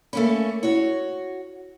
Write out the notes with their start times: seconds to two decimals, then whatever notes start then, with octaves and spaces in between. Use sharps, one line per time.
0.13 A3 A#3 C#4 B5
0.63 E4 F#4 C#5